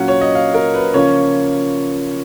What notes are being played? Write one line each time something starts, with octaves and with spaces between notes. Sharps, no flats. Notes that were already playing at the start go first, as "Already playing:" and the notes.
Already playing: A#2 F#3 C#4 F4 F#5
C#5
D#5
F5
A#4
B4
C#3 F3 A#3 C#4 F4 C#5